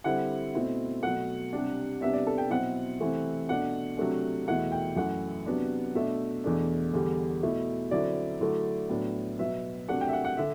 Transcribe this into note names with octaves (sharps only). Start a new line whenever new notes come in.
D3 G3 C4 E4 F#5
B2 A3 C4 E4
B2 F#3 A3 F#5
C3 G3 D4
C3 G3 B3 D4 E5
D5
A4
G5
B2 F#3 C4 E4 F#5
C3 E3 A3 C4 E4
B2 A3 D4 F#5
C3 F#3 A3 D4
E2 B2 A3 E4 F#5
G5
F#2 E3 A3 E4 F#5
C3 F#3 B3 D4
B2 A3 D4 E5
E2 B2 A3 D4
E2 D3 G3
B2 A3 E4
D3 F#3 C4 E4 D5
D3 F#3 A3 E4
A2 F#3 B3 D4
B2 F#3 B3 E5
C3 F#3 A3 D4 F#5
G5
E5
F#5
F#5
D3 E5